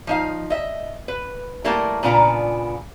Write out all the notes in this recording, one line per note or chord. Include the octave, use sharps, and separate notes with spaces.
F3 D#4 F5
D#5 E5
B4
G3 A3 A#3 E4 A#4 A5
A#2 C#3 B3 D4 F4 A#5